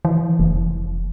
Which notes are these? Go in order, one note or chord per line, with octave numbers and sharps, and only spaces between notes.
E3
F1